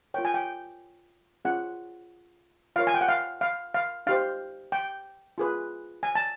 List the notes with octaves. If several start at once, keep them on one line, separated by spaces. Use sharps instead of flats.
F4 A#4 C#5 G5
G#5
G5
C#4 F4 G#4 F#5
F4 A#4 C#5 F5
G#5
G5
F#5
F5
F5
F5
D#4 G4 C5 F5
G5
F4 G#4 B4
G#5
A5